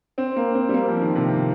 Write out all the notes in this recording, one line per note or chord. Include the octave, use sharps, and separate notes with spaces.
C4
A#3
C4
G3
A#3
F3
D#3
C3